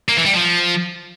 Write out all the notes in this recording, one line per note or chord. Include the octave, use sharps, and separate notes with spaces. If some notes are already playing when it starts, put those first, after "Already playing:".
A#3
E3
G3
F3